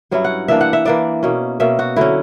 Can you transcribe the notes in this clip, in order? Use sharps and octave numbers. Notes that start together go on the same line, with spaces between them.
G2 F#3 C#4 E4
F#5
E3 A#3 D4 E5
F#5
E5
E3 A#3 D4 D5
B2 A#3 C#4
B2 A#3 C#4 E5
F#4
D3 F#3 C#4 E4